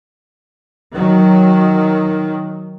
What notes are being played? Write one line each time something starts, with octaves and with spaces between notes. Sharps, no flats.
D#3 F#3